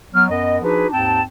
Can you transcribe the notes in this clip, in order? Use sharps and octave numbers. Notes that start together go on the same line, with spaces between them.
F#3 B3 F6
F#2 B3 A#4 D#5
F3 D4 D#4 F#4 G#4 B4
D#2 G#2 C4 G5 A5